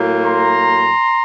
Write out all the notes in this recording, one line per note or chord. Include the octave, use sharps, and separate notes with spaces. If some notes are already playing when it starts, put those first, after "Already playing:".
Already playing: A2 F#3 A#3
A#5 C6